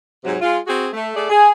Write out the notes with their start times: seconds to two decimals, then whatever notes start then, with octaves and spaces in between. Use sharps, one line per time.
0.24 G#2 C3 F#3
0.41 G#3 F4
0.67 C4 F#4 G#4
0.93 A3
1.16 A3 G#4 D5
1.29 G#4 G#5